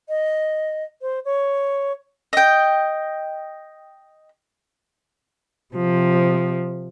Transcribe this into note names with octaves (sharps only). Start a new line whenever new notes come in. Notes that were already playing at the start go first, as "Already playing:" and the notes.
D#5
C5
C#5
D#5 G5
C3 F3